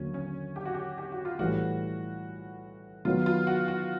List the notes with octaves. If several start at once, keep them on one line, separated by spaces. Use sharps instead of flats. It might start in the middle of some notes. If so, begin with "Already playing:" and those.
Already playing: D#2 D3 F#3 A#3 C#4
C#4
G4
F#4
G4
G4
F#4
F4
A2 E3 G3 F#4
D#3 F#3 B3 F4
F4
F#4
F#4